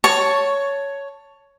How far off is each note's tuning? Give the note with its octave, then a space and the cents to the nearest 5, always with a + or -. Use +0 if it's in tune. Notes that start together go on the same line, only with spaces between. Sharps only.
C#5 +10 A5 +5 C#6 +0